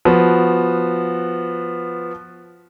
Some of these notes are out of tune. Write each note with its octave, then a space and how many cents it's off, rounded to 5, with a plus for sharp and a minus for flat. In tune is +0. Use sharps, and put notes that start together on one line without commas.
F3 +0 B3 +0 F#4 +0